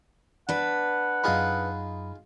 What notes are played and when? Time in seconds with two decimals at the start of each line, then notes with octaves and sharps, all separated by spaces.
0.49 D4 B4 F#5
1.24 F#2 D#4 F4 G#4 B5